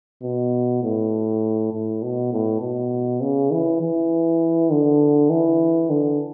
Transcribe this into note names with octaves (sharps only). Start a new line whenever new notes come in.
B2
A2
A2
B2
A2
B2
C#3
E3
E3
D3
E3
D3